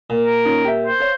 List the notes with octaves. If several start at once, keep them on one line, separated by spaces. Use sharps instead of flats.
A#2
A#4
C#4 D#4 F4
G4 E5
C5
C#5 F5